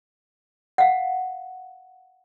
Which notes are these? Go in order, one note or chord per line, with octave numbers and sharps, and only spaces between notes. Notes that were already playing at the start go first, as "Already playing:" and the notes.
F5 F#5